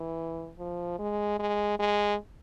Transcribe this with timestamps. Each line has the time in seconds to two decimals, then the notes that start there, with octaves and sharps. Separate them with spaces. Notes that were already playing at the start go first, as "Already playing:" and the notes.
Already playing: E3
0.59 F3
0.99 G#3
1.39 G#3
1.79 G#3